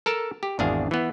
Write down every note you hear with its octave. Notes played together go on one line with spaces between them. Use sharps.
A4 A#4 A5
G4
G#1 E2 D4 G#4 F5
E3 B3